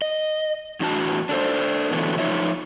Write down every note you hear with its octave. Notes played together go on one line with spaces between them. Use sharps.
D#5
E2 A2 D4 F#4 A5
D4 A4 C5
B2 D3 E3 F#3 A3 B3
F3 A3 D#4 F4 C#5 E5